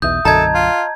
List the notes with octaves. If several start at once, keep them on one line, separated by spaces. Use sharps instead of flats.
B1 E2 B2 E5 D#6 G6
B1 F#2 D3 A4 D#5 A5 A#5 G#6
F4